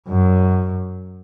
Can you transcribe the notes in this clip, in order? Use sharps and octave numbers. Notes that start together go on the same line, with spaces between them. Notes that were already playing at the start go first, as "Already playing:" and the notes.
F#2